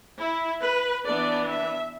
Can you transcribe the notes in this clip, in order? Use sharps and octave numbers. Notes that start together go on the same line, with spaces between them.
E4
B4
E3 B3 D4 D5
E5